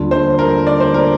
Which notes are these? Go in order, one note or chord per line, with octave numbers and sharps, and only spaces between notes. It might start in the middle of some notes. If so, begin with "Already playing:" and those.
Already playing: D#2 D3 G3 D4 F4
C5
A#4
D5
C5
A#4